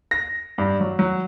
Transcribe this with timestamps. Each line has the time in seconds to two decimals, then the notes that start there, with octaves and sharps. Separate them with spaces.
0.11 A#6
0.58 G2
0.80 F#3
0.99 F#3